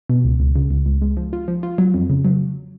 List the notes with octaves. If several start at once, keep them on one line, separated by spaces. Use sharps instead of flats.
B2
C#2
C#2
C#3
C#2
C#2
G#3
F3
F4
F3
F4
F#3
F2
C#3
F#3